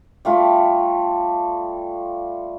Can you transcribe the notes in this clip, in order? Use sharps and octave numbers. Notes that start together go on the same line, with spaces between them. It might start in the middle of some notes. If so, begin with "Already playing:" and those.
G3 A3 F4